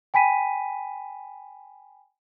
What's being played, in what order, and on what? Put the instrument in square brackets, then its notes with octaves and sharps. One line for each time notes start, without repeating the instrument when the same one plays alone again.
[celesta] G5 G#5 B5 B6 D#7